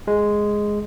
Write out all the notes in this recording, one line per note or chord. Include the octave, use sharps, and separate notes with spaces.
G#3